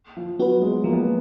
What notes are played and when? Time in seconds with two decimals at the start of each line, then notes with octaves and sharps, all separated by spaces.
0.17 F3
0.39 F#3 B3 F#4 B4
0.62 G#3
0.84 F3 A#3
0.93 B3
1.00 A#3